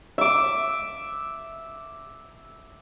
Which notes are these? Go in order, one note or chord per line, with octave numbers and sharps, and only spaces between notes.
E5 D6